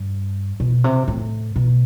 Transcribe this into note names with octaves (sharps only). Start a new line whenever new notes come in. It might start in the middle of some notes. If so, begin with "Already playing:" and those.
Already playing: G2
B2
C3
A2
B2